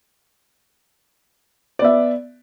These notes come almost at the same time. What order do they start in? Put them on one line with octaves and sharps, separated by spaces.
D5 B3 E5